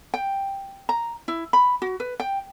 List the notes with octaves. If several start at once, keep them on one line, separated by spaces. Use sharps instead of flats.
G5
A#5
E4
B5
F#4
B4
G5